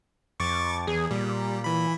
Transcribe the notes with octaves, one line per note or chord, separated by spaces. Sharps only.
F2 C#6 D6 A6
E2 G#4
A#2 G3
E3 B5